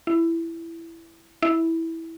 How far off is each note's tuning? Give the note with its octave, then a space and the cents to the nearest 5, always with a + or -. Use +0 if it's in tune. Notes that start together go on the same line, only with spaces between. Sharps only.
E4 +10
E4 -10